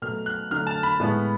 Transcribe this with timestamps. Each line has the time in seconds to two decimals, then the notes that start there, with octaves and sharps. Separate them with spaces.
0.02 B2 F#3 A3 F6
0.26 F#6
0.50 D3 F#3 A3 F6
0.67 A5
0.83 B5
1.00 A2 G#3 B3